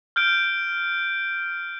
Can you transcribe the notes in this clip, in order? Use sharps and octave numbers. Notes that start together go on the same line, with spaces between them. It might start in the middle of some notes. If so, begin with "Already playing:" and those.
F6 G6 D7